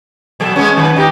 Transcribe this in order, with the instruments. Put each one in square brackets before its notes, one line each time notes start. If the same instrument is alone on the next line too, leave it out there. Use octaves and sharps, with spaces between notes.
[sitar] B2 F#3 A4
G#3 B3 C#4
D#3 B4
D#4 G4